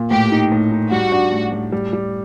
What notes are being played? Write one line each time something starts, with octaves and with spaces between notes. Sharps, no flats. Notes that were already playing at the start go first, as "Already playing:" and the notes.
Already playing: A#2
A2 G4
D#4
A2
D#4
G3 F#4
D4
A2
A2
G3
G3